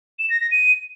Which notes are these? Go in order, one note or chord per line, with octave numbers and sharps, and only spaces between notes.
E7
A#6
A#6
D#7